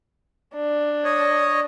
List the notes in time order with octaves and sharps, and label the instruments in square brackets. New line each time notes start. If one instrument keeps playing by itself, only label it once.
[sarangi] D4
[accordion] C#5 D#5